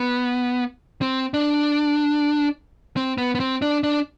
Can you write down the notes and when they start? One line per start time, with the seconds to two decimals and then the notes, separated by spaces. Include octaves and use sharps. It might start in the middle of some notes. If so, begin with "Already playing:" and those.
Already playing: B3
1.02 C4
1.34 D4
2.96 C4
3.18 B3
3.35 B3
3.40 C4
3.62 D4
3.83 D4